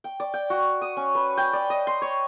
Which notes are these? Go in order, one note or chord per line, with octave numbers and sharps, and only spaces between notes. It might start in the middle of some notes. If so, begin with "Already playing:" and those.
G5
D5
G5
F#4
D#6
C#4
B4
G5
D5
D#5
C6
C#5